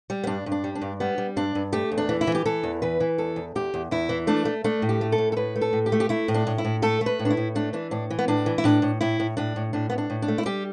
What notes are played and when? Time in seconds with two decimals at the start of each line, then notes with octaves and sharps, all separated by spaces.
0.10 G3
0.24 B3
0.27 G2 D4
0.46 G2
0.52 D4
0.64 G3
0.75 D4
0.81 G2
1.00 G3 B3
1.18 G3
1.36 G2 D4
1.55 G2
1.73 A3 G4
1.92 E2
1.98 D4
2.09 E3
2.21 E4
2.27 E3
2.35 G4
2.46 E3 A4
2.63 E2
2.82 E3 B4
3.00 E3
3.18 E2 A4
3.36 E2
3.55 E2 G4
3.74 E2
3.91 E2 E4
4.09 E3
4.27 A3 D4
4.45 A3
4.64 A3 D4
4.82 A2
4.89 G4
5.01 A3
5.12 A4
5.18 A2
5.32 A4
5.37 A2 B4
5.56 A3
5.61 A4
5.73 A2
5.86 G4
5.92 A3
6.00 G4
6.09 A3 E4
6.28 A2
6.34 D4
6.47 A2
6.58 E4
6.65 A2
6.82 A3 A4
7.01 A3
7.06 B4
7.19 A2
7.25 D4
7.30 E4
7.37 A2
7.55 A3 D4
7.73 E3 D4
7.91 A2 D4
8.10 E3
8.19 B3
8.28 A2 D4
8.46 E3
8.58 E4
8.64 A2 D4
8.82 A2
9.01 A2 E4
9.20 A2
9.37 A2 D4
9.56 A2
9.73 A2 D4
9.90 A2 B3
9.98 D4
10.10 A2
10.22 D4
10.28 A3
10.38 E4
10.46 G3 G4